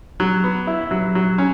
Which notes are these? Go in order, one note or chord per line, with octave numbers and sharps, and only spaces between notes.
F#3
B3
E4
F#3
F#3
C#4